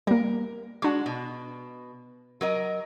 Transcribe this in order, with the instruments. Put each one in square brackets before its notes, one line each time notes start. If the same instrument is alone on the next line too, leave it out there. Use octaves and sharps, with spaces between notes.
[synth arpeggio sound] G3 A#3 [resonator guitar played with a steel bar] A#4
[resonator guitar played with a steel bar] G#3 F#4 [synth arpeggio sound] D4 C#6
[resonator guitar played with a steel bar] B2
F#3 A#4 D#5